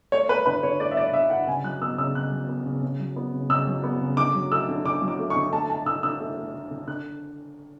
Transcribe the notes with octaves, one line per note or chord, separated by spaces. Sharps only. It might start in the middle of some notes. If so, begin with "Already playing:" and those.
A3 C#5
A3 B4
D3 B4
D3 C#5
A3 D5
E5
A3 D5
D3 E5
D3 F#5
C#3 G#5
F#3 F#6
B3 E6
C#3 E6
C#3 F#6
F#3
B3
C#3
C#3
F#3
B3
C#3
C#3 E6
F#3
B3
C#3
D3 D6
F#3
A3 E6
D3
D3 D6
F#3
D6
A3
C#6
D3
A3 A5
A3 A5
D3 E6
D3 E6
A3
A3
D3
D3
D3 F#6